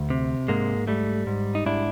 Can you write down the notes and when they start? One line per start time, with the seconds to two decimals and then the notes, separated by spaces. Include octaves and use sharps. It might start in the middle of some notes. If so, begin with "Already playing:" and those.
Already playing: D2
0.10 C3
0.48 G#2 G#3 A#3
0.87 G3 A3
1.27 G#2
1.55 D#4
1.66 G#2 D4 E4